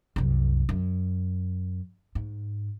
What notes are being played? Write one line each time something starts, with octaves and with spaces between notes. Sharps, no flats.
C2 F#2
F#2
G#2